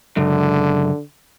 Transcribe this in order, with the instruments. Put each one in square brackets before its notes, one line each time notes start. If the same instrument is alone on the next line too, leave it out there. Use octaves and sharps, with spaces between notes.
[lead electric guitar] C#2 F#2 [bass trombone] D3